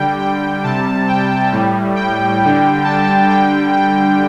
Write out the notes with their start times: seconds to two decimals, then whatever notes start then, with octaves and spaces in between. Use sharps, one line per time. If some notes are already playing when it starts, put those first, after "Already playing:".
Already playing: D3 G3 G5
0.19 G5
0.64 C3 G3 A5
1.08 G5
1.52 A2 G3
1.96 G5
2.41 D3 G3
2.84 A5
3.29 D3 G3 G5
3.73 G5